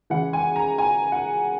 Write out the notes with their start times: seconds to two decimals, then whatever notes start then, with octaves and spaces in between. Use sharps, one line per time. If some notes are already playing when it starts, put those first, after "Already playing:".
0.10 C#3 E3 G#3 F#5
0.33 G#5
0.56 A#5
0.78 G#5
1.12 F#5